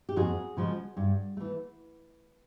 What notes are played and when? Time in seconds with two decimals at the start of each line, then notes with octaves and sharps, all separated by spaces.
0.09 G4
0.16 F2 F#4 G#4
0.57 C#3 F3 G#3
0.97 G2
1.37 E3 A3